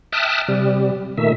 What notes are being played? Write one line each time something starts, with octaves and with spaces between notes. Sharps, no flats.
E5 G5 A5 D#6 F6 F#6
C3 G3
A#2 D#3 A3 E5